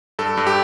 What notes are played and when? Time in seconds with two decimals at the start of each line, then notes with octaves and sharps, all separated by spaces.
0.19 G2 A4
0.37 G2
0.47 G4